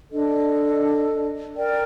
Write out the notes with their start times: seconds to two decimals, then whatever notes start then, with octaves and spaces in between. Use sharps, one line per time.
0.11 D4 A4 D#5
1.54 A#4 D5 G5